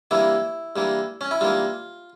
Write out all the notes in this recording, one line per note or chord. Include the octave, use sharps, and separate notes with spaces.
G2 E3 A#3 E4
G2 E3 A#3
C#4
E4
G2 E3 A#3 F4